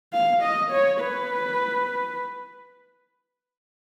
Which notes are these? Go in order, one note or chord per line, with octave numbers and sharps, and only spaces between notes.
F5
D#5
C#5
B4